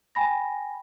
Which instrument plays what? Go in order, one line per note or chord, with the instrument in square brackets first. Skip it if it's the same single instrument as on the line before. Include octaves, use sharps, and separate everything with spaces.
[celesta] G5 G#5 B5 A#6